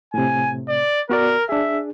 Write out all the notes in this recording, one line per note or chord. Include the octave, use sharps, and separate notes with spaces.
A2 C3 G#5
D5
B3 F#4 A#4 D5
D4 G#4 E5